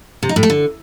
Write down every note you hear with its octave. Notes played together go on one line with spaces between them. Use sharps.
C3
D#4
A2
A3
D3